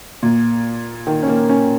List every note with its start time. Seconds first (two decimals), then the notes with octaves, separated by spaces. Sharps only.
0.23 A#2
1.07 D#3
1.23 C#4
1.28 A#3
1.49 C#4